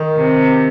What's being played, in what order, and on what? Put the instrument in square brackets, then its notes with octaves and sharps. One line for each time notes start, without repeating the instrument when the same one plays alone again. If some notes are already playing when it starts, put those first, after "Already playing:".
Already playing: [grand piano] D#3
[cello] C3